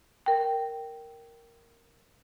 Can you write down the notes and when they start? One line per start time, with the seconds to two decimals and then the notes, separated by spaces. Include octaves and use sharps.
0.26 A#4 G5